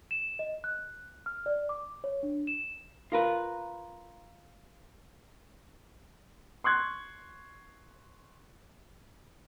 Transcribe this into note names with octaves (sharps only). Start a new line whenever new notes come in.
E7
D#5
F#6
F6
D5
D6
C#5
D4
E7
F4 A#4 B4
C6 C#6 F#6 G#6